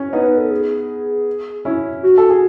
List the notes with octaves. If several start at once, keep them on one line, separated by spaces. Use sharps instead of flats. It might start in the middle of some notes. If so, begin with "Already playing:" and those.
Already playing: C#4
B3 D#4 C#5
B4
A4
G#4
C#4 E4
F#4
A4
G#4